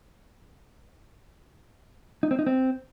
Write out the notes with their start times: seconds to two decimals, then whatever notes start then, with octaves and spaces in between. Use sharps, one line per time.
2.23 D#4
2.31 C4
2.39 D#4
2.47 C4